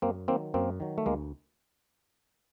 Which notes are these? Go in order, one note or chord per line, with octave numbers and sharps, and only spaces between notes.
F#2 A#3 C4
D#3 F#3 A#3 C4
F#2 A#3 C4
D#3 F#3
A3
D2 G#3 A#3